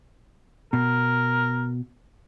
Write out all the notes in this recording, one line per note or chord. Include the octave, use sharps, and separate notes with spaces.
B2 A#4